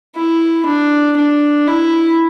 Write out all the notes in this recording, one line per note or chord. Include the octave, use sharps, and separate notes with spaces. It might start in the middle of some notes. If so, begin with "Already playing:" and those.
E4
D4
D4
E4